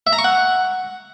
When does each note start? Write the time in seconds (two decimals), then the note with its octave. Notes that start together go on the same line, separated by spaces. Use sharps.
0.07 E5
0.13 A#5
0.19 C#6
0.24 F#5